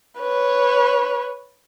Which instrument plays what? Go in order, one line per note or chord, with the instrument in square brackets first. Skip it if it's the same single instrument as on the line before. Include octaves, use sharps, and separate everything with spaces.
[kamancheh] B4 C#5